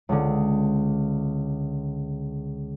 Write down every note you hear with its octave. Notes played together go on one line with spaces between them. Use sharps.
C#2 D3